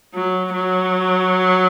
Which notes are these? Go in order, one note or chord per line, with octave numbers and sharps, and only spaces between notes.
F#3
F#3